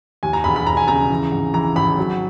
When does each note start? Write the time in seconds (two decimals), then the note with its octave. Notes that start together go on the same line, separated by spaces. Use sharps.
0.23 D#2 G#5
0.33 A#5
0.44 E1 B5
0.56 B5
0.66 E1 A#5
0.77 G#5
0.88 C#3 A#5
1.10 E3
1.32 G#1
1.54 E3 A#5
1.75 G#1 B5
1.98 F#3